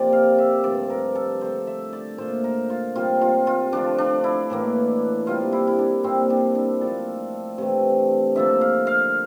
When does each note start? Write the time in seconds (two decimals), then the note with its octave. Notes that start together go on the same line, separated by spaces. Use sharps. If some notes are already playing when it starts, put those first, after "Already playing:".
Already playing: C3 F3 A#3 D5
0.13 F5
0.38 E5
0.64 G2 F3 A3 D5
0.90 A#4
1.15 A4
1.41 D3 A3 C5
1.67 E5
1.93 D5
2.18 A#2 A3 C5
2.44 A#4
2.70 F4
2.95 C3 G3 A#3 F4
3.21 F4
3.47 F4
3.72 D3 F3 A3 D4
3.98 D4
4.24 E4
4.50 A2 E3 A#3
5.27 C3 G3 A#3 F4
5.53 E4
5.67 E4
5.79 D4
6.04 A#2 G3 A#3 C4
6.30 D4
6.55 D4
6.81 A#2 F3 A3 A4
7.58 C3 E3 A3
8.35 D3 F3 A#3 E5
8.61 F5
8.87 F5